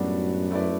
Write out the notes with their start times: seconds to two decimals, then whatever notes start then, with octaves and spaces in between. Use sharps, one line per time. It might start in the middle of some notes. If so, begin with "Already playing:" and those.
Already playing: F#2 A2 G3 B3 D4 F#4
0.51 A3 E4 B4 D5